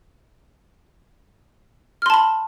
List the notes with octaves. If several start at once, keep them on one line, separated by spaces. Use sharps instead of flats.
A5 B5 C6 F6